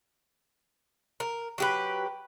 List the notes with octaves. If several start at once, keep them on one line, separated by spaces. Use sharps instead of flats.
A#4
F#3 G4 B4